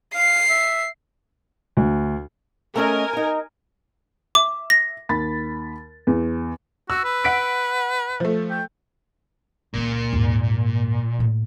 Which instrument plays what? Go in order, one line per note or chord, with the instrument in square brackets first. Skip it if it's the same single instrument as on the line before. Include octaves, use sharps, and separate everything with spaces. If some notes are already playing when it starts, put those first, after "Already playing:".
[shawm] F5 [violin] C7
[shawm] E5
[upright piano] D2
[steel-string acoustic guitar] A3 C#4 D#5 [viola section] A#4 G#5
[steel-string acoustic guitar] D#4 A#5
[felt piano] E5 [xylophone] D6
[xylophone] A#6
[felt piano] D#2 B5 A6
E2
[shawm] F#4 [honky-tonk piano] E6
[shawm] B4
[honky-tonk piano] F#5 B6 D7
F3 A3
[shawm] G5
[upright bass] C#2 D#3 [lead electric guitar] A#2
[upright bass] D#2 G#2
A2 A#3